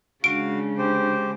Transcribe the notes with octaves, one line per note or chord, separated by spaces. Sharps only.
C#3 G#3 D4 F#4 F5 D7
G4 C5